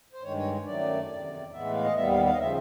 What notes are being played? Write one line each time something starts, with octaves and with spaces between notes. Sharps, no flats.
C5
G2 D#3 G#3 C#5
C#5
F#2 D#3 F#3 A3 D5
E2 C3 D#3
A2 E3 G#3 B3 E5
F5
D#5
D#2 D#3 G3 B3 E5
F5
F5
D#5
C#3 F3 E5